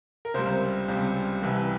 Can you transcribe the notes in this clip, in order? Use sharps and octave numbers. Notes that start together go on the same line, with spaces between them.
A#4
C#2 C3 G3 C5
C#2 C3 G3
C2 C3 E3 G3